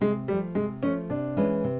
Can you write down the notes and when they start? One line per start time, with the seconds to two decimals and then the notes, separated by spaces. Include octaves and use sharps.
0.01 C3 G#3
0.28 F3 G3 A3
0.55 C3 G#3
0.83 F3 A3 C#4
1.10 C3 D4
1.37 E3 G#3 C#4 E4
1.64 C3